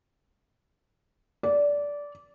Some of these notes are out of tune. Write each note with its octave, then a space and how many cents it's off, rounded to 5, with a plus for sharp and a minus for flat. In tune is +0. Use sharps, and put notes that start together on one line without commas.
D5 -15